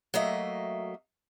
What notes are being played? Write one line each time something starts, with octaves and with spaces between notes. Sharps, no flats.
F#3 A3 A#3 D#5 E5